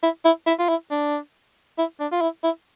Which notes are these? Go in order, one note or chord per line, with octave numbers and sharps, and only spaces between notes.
E4
E4
E4
F4
E4
D4
E4
D4
F4
E4
E4